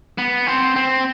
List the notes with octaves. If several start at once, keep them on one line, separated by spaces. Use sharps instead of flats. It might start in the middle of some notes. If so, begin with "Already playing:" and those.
B3
C4
C4